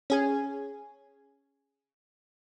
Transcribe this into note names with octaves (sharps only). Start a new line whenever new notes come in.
C#4 G#4 G#5